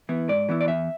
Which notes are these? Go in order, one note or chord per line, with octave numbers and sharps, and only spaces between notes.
E3 B3 E4
G#2 D5
E3 B3 E4
D5
E2 E5